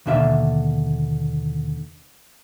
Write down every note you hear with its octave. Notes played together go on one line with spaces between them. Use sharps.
D#2 B2 D3 D4 E5 F5